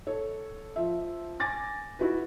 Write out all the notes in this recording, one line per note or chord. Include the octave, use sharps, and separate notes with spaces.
A4 C#5
F3 E5
G#5 D6 A6 A#6
E4 F#4 B4